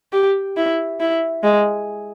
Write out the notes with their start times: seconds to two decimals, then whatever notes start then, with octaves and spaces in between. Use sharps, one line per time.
0.13 G4
0.57 E4
1.00 E4
1.44 G#3